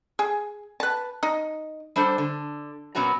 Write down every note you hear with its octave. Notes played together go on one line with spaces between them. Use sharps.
G#4
B4 A5
D#4
G3 D4 A4 C5
D3
A#2 F#3 B3 C#4 F#4 A#5